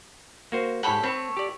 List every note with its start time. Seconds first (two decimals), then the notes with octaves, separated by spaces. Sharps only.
0.52 A#3 F#4 C5
0.83 G#2 G4 A4 C#5 F#5 B5
1.03 A3 C4 C#5
1.37 G4 D5